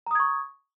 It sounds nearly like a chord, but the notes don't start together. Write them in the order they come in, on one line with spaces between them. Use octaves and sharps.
A#5 D#6 G#6 C#6